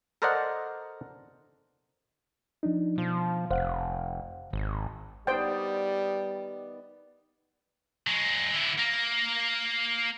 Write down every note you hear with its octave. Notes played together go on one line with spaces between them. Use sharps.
A4 A#4 C5 D5 D#5 F#5
F3 D4 D#4
B2 F3
F1 C5 F5 F#5
G#1
D#3 G3 B3 C5 D5 G5
F#3 G#3
D3 E4
A#3